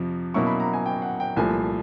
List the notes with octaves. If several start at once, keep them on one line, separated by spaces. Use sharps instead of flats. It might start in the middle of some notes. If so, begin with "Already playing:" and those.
Already playing: F2 C3 F3
B2 F#3 A#3 C#4 E4 C#6
B5
A#5
G#5
G5
F#5
G5
C2 A#2 F3 A3 G#5